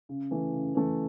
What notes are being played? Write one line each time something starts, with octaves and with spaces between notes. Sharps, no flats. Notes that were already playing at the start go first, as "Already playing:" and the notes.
C#3
E3 A3
C#3
E3 A3